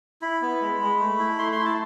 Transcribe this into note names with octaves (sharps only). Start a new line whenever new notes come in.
E4 B5
B3
G#3
G#3
A3
E4
A3 C6
C6
E4
A5